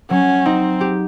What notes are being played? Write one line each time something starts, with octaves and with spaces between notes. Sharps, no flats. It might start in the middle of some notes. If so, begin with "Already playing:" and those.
F#3 C#4
C4 D#4
G4